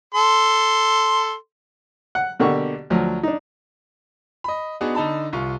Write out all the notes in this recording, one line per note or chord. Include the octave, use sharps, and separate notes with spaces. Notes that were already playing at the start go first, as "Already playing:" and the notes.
A4 C6
F#5
B2 D3 A#3 G4 C#6
D2 F3 F#3
D4 D#4
D#5 B5
B3 D4 D#4 F#4 G#4
D3 D#4 A5 B5
C2 F4 C#6